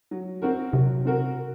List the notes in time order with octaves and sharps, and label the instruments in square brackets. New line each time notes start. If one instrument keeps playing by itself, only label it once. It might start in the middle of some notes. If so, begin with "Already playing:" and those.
[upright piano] F#3
C4 F#4 A#4
[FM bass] C3 [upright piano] F#3
[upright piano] C4 F#4 A#4